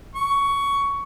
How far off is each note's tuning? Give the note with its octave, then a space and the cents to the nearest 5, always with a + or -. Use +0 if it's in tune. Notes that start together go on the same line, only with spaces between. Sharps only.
C#6 +15